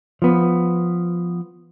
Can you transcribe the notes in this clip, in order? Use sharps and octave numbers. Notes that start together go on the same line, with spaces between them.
F3 B3